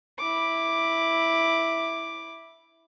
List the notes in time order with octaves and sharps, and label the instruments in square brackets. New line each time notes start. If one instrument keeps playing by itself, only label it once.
[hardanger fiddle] E4 D6